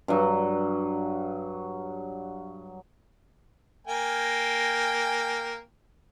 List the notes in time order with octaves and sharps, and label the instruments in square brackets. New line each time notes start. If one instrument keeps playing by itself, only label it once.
[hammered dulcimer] G2 F#3
[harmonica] A#3 G5 G#5